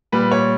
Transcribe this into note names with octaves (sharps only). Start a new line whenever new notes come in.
A#2 G3 B4
C#5